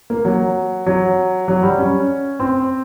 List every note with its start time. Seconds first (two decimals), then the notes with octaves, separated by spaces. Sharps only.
0.10 A#3
0.25 F#3
0.86 F#3
1.48 F#3
1.63 G3
1.78 C#4
2.39 C4